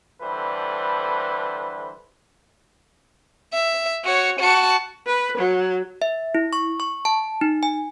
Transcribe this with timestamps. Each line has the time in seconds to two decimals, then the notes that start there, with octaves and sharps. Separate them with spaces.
0.21 D3 E3 G3 A4 B4 C5
3.53 E5
4.05 F#4 C#5
4.40 F#4 A5
5.06 B4
5.37 F#3
6.02 E5
6.35 E4
6.53 C#6
6.80 C#6
7.05 A5
7.41 D#4
7.63 G#5